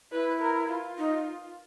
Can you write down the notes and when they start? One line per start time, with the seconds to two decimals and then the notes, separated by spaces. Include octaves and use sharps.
0.12 E4 B4
0.41 A#4
0.69 F4
0.98 D#4